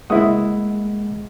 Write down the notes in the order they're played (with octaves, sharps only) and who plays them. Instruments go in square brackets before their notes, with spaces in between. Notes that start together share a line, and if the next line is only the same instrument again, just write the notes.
[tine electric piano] G#3 A#3 F#5 [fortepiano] E4 D#6